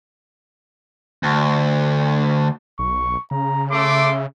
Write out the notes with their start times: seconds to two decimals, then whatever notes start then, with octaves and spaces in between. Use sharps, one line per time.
1.23 D2
2.79 B1 C#6
3.31 C#3 A#5
3.71 A3 E5 C6 D6